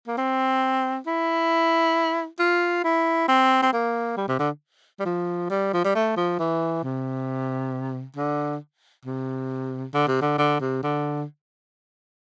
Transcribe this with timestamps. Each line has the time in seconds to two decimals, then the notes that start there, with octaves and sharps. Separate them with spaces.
0.08 A#3
0.18 C4
1.07 E4
2.40 F4
2.84 E4
3.29 C4
3.62 C4
3.73 A#3
4.17 G3
4.28 C3
4.39 D3
5.00 G3
5.05 F3
5.50 G3
5.73 F3
5.84 G3
5.95 A3
6.17 F3
6.39 E3
6.84 C3
8.16 D3
9.05 C3
9.94 D3
10.08 C3
10.21 D3
10.38 D3
10.61 C3
10.83 D3